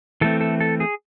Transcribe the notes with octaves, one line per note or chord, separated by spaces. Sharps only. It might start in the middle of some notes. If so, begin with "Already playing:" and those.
E3 A3 C4 A4
A4
A4
G#4